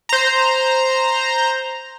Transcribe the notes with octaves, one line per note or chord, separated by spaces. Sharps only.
C5 A#5